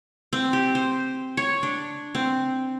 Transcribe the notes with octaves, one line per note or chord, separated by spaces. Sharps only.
C4
G4
C5
C#5
D4
C4